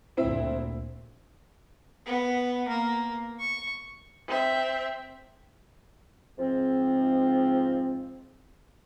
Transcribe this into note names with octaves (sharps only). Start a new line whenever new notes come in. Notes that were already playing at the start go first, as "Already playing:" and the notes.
D2 A#2 C4 E4 E5
B3
A#3
C#6
C4 E5
G#2 F3 C4